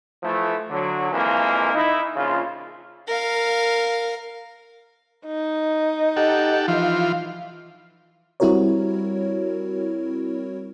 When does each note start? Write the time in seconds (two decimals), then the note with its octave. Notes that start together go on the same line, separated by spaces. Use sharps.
0.22 E3 F3 A3
0.69 D3 F#3
1.11 F2 E3 G#3 A#3
1.74 D#4 E4
2.16 A#1 C#3 F4
3.07 A#4 F5
5.27 D#4
6.17 G4 A4 F#5
6.68 E3 F3 F4
8.40 G3 C4 E4 F#4 A#4 C#5